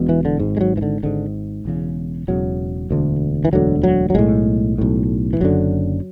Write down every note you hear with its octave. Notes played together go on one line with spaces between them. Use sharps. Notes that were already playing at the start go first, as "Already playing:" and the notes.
Already playing: E1 E2 B2
E3
D3
G#1 G#2
G#3
F#3
E3
D3
G#1 G#2 D3
E1 E2 C#3
E1 E2 C#3 F#3
E1 D2 D3
E3
E1 D2 D3 F#3
F#3
F#3
B1 A2 G#3
B1 A2
E3
F#1 F#2 D3 F#3